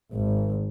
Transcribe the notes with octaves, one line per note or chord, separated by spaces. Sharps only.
G#1